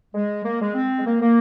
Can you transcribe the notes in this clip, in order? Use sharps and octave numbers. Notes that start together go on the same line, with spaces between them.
G#3
A#3
G#3
C4
G#3
A#3
A#3